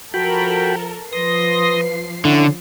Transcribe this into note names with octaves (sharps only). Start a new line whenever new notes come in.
F3 F#4 A4 A#4 G5 B5
F3 B4 C6 D#6 A#6 C7
D3 C#4 E4 C#6